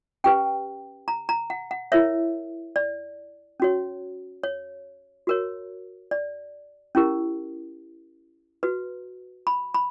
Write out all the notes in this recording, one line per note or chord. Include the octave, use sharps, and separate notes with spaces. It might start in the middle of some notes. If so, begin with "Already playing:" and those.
C#4 G4 B4 G5
A#5
A#5
F#5
F#5
E4 A#4 C#5 E5
D5
C#4 F#4 C#5
C#5
F#4 A#4 C#5
D5
C#4 E4 G4 A#4
F#4 B4
B5
B5